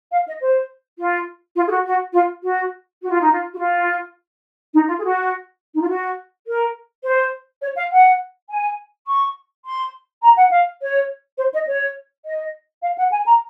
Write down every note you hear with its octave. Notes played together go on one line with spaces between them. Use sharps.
F5
D#5
C5
F4
F4
G#4
F#4
F#4
F4
F#4
F#4
F4
D#4
F4
F#4
F4
D#4
F4
G#4
F#4
D#4
F4
F#4
A#4
C5
C#5
F5
F#5
G#5
C#6
C6
A#5
F#5
F5
C#5
C5
D#5
C#5
D#5
F5
F#5
G#5
A#5